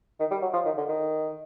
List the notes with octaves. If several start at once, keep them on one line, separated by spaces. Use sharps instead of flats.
D#3
G3
F#3
F3
D#3
D3
D#3